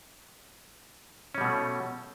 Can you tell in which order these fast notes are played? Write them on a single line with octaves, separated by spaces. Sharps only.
C#4 G3 B2 A3